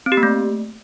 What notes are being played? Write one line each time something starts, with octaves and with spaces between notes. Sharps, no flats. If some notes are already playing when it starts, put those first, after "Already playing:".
C4
G4
A#3
A3